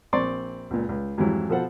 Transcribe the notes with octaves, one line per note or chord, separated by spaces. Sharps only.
A#1 C4 D5 C6 C#6
C#2 A#2
C#2
F2 G#2 E3 F#3 G3 E4
B2 F3 A4 C5 F#5